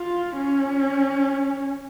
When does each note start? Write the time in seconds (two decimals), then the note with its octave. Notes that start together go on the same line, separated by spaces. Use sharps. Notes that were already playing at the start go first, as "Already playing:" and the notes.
Already playing: F4
0.37 C#4